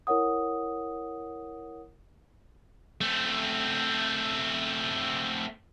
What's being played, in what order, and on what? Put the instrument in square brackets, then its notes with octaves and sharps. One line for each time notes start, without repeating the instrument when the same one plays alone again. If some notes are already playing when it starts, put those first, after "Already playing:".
[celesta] E4 A#4 C#5 F#5 D#6
[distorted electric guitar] A3 C4